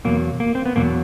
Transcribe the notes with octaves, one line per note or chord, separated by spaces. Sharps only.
E2 B2 F#3 A#3
A#3
C4
B3
E2 B2 F#3 A#3